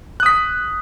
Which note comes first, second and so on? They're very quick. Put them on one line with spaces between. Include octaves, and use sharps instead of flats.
F#6 D#6 B6